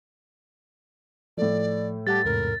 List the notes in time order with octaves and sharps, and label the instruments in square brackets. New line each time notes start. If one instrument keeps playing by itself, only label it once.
[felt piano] A2 A3 [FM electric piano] F3 [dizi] D5
[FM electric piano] G3 F#5 A5 [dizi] G4 [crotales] A6
[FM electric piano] E2 G#2 C3 [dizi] A#4